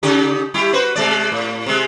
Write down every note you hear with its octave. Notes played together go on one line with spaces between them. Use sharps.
C#3 D#4 G4
G3 E4 G4
F#4 B4 C5
C3 G#3 D5
A2
C3 G#3